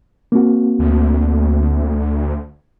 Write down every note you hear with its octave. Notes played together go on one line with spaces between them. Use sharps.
A#3 C4 F#4
D2